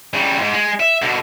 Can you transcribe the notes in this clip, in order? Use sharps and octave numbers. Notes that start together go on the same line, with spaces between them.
C#3 G3
F2 G#2
G#3
E5
B2 D3